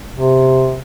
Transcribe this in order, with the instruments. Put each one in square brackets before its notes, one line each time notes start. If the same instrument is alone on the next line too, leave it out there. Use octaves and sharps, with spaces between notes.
[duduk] C3